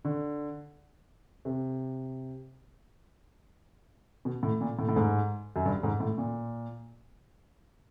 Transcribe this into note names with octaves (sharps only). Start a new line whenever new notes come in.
D3
C3
B2
A2
A#2
A2
A2
G#2
F#2
G2
G#2
A2
A#2